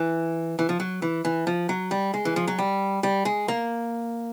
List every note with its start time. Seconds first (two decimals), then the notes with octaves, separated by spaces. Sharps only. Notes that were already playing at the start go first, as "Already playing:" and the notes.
Already playing: E3
0.59 E3
0.69 F3
0.80 F#3
1.02 E3
1.25 E3
1.47 F3
1.69 F#3
1.91 G3
2.14 G#3
2.25 E3
2.36 F3
2.48 F#3
2.58 G3
3.03 G3
3.25 G#3
3.48 A#3